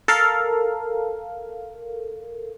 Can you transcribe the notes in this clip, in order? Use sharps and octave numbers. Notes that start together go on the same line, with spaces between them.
A4 A#4 F5